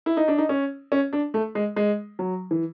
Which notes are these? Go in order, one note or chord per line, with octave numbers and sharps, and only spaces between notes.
E4
D#4
D4
D#4
C#4
C#4
D4
A3
G#3
G#3
F#3
E3